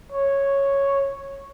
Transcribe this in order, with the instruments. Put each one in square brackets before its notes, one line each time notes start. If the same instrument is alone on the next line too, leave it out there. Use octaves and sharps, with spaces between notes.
[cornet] C#5